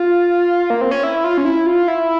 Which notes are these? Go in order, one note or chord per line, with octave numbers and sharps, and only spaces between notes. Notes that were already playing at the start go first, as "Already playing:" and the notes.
Already playing: F4
A#3
C4
C#4
E4
F4
C#4
E4
F4
E4